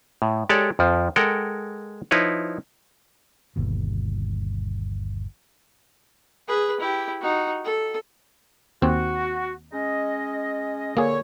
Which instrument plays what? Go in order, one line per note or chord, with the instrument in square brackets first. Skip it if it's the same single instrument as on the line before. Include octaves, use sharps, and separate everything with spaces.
[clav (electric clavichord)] A2
G#3 G4 A4 C#5 D5
F2 F3
G#3 A4 A#4 F#5 G5
F3 D#4 E4 B4 C#5
[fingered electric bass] G1 D#2 B2
[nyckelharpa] G#4 B4
E4 G4
D#4 F#4
A4
[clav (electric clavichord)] D#2 C4 [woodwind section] F#4
[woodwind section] G#3 C#4 D#5
[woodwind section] A#2 D3 C#5 [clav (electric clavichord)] A#3 G#4